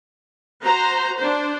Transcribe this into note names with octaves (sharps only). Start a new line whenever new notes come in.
F#4 C5 A#5
D4 C5